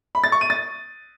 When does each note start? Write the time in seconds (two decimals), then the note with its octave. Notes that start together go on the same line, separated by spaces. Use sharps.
0.15 B5
0.24 A6
0.32 C#6
0.41 D#7
0.50 A6